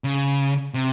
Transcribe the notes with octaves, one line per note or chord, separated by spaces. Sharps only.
C#3
C3